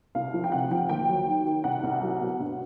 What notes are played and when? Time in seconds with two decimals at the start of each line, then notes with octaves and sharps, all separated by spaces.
0.15 C2 F5
0.34 F3
0.44 G5
0.52 C3 F#5
0.71 F3 G5
0.89 D#2 G5
1.09 F#3
1.27 D#3
1.46 D#3
1.64 C2 F#5
1.83 C2
2.02 F#3
2.20 B2
2.40 G2